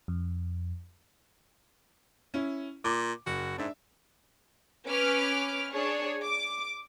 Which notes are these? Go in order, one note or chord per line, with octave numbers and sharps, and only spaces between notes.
F2
C#4 E4
A#2 D6
F#1 F#4
G#2 D4 E5
C#4 B4 D6 F6
D4 G#4 C#5
D6